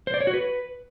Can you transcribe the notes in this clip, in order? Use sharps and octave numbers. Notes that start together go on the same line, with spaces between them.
C5
D5
C#5
F#4
B4